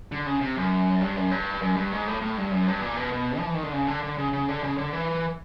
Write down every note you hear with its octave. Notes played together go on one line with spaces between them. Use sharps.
D3
C#3
C3
F#2
G2
F#2
G2
F#2
G2
G#2
A2
A2
G2
F#2
G2
A#2
B2
B2
F3
E3
D#3
D3
C#3
D3
D3
C#3
C#3
D3
C#3
D3
E3